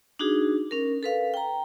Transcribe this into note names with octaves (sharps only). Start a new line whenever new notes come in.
D4 D#4 F#4 G#4
C#4 A#4
A4 B4 F5
G5 A#5